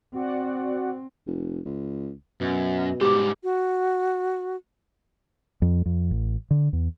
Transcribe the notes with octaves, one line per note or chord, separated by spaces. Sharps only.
C4 F#4 D5 F#5
F1
C#2
F#2 B2
G#2 G3 G4 C5 D6
F#4
F2
F2
A1
D3
E2